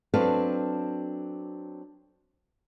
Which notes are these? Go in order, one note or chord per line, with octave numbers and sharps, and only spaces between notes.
F#3 C4 D4 A4 B4 F5